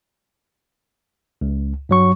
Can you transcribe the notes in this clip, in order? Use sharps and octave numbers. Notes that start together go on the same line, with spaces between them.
C#2
G2 F#3 C#6